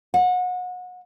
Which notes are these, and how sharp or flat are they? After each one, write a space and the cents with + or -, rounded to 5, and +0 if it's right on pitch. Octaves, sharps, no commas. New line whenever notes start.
F#5 -30